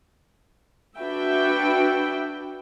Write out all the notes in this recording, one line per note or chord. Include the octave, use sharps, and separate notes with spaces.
D4 F#4 B4 E5 G5